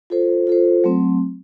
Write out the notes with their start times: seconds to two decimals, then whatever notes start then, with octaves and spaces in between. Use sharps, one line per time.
0.10 F4 A4 C5
0.47 F4 A4 C5
0.84 F#3 A3 C4